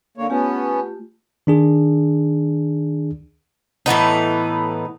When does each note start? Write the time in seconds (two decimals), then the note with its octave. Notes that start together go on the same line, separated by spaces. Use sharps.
0.18 D3 A#3 C#5
0.30 A3 B3 C#4 F4 G4
1.47 D#3 D4 G#4
3.86 A2 E3 B3 D#4